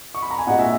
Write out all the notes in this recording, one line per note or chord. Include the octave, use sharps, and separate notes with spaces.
C#6
B5
A#5
G#5
A#2 G#3 D#5 F#5
E5 G#5